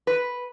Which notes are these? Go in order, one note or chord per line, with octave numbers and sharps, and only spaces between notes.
B4